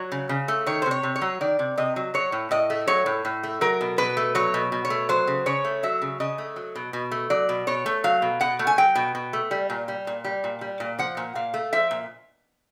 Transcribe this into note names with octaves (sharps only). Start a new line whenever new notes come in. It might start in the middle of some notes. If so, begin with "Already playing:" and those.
Already playing: F#3 C#5
C#3
C#3
A3
D#3 C#5
C5
C3
C#5
C3
C#5
F#3
D#3 D5
C3
C3 D#5
F#3
F#3 C#5
A2
A2 D#5
A3
F#3 C#5
A2
A2
A3
F#3 A#4
B2
B2 B4
A3
F#3 C#5
B2
B2
C#5
A3
F#3 C5
C#3
C#3 C#5
A3
F#3 E5
C#3
C#3 D#5
A3
F#3
B2
B2
A3
F#3 D5
B2
B2 C#5
A3
F#3 F5
B2
B2 F#5
A3
G#5
F#3 G5
B2
B2
A3
G3
A#2
G3
A#2
G3
A#2
G3
A#2
F3 F#5
A#2
A#2 F5
A3
F3 E5
A#2